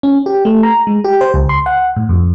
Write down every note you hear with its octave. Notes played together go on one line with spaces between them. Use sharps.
C#4
G4
A3
A#5
G#3
G4
C5
C#2
C6
F#5
A2
F2